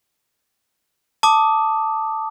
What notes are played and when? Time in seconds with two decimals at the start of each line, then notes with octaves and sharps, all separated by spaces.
1.23 A5 D6 D#6